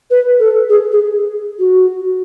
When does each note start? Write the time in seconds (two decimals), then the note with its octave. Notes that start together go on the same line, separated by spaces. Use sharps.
0.10 B4
0.39 A4
0.69 G#4
0.91 G#4
1.59 F#4